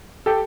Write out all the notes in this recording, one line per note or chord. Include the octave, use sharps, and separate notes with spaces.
G4 A4